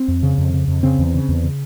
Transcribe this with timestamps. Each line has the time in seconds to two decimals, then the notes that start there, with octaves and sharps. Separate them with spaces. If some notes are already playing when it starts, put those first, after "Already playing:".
Already playing: C4
0.08 F2
0.23 C#3
0.38 F2
0.53 C#3
0.68 F2
0.83 C#3 C4
0.99 E2
1.14 C#3
1.29 E2
1.43 C#3